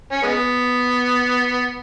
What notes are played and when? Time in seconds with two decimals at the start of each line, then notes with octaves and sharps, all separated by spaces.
0.12 C#4
0.23 G#3 B3